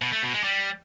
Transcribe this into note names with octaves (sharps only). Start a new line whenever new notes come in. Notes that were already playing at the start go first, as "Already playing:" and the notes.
B2
A3
B2
G#3
G3